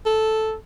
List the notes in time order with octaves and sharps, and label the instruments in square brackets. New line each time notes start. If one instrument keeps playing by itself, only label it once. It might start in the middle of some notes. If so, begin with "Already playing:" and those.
[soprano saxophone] A4